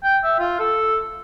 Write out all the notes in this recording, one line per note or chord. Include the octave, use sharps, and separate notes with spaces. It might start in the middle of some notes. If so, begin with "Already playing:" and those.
G5
E5
F4
A4